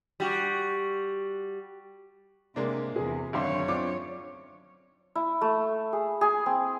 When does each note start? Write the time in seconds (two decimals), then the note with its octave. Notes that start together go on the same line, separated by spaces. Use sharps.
0.20 G3 F#4
2.56 C3 G#3 A#3 D4
2.96 E2 C3 G#4
3.33 G#1 F#2 D3 C#5 E5 F5 C6
3.68 C4 D4 F4 D6
5.15 E4
5.41 A3
5.93 G#4
6.21 G#4
6.46 C4